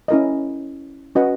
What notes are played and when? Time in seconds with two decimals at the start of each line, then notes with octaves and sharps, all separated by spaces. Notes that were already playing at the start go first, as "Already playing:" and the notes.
0.08 C#4 E4 A#4 D#5
1.15 C#4 F#4 B4 D#5 F#5